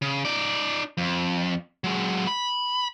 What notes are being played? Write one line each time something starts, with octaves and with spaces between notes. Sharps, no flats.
C#3
D#4 D5
F2
F#3 G#3
B5